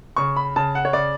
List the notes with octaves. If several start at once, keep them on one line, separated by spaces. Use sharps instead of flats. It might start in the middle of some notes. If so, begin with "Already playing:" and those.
C#3 C#6
B5
C#3 A5
F#5
C#5
C#3 D5